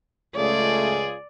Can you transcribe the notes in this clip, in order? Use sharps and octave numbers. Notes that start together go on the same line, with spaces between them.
C#2 A3 F4 G#4 D5